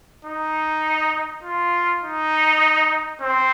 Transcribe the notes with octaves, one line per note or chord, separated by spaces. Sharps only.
D#4
F4
D#4
C4